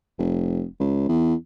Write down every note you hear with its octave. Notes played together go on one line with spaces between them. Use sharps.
F1
C#2
E2